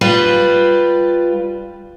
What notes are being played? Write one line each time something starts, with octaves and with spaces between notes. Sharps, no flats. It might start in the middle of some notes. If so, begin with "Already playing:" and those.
G3 F4 B4